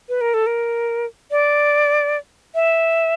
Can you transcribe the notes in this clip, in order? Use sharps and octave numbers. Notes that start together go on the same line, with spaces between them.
B4
A#4
A4
A#4
D5
E5